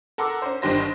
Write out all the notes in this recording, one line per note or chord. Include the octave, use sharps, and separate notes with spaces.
A4 A#4 F#5 C6 D6 E6
C#4 C5
G1 D#3 D4 G4 C5 A#6